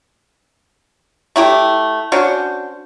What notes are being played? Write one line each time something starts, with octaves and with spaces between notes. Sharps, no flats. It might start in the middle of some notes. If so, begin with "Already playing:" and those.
A3 E4 G4
C#4 D4 F#4 C5